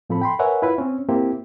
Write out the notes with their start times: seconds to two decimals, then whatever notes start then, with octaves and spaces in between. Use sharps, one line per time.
0.10 A2 F3 C4 A4 B5
0.21 G5 B5 C6
0.39 A#4 B4 C#5 E5 F#5 G#5
0.62 E4 F4 B4
0.78 C4 C#4
1.09 A#3 C4 E4 G4